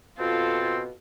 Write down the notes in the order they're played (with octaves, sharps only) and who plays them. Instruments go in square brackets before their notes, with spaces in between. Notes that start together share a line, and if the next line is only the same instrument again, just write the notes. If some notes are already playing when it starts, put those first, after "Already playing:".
[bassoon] B2 [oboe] C4 [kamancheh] F4 A4